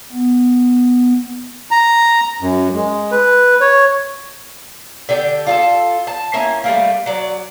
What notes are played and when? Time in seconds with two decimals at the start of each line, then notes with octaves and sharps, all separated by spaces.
0.12 B3
1.71 A#5
2.41 F#2
2.74 G#3
3.11 B4
3.61 C#5
5.09 D3 D4 G4
5.47 F4 G#4 A4
6.07 A5
6.34 A#3 C#4 E4
6.64 G3 A3 A#3
7.06 F#3 D5